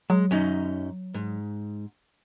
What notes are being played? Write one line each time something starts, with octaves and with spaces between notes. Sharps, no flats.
F#3 G#3
F#2 C#4 D#4
G#2